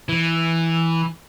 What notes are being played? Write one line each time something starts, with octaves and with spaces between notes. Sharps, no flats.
E3